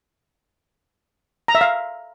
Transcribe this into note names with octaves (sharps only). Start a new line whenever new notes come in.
A#5
E5
F5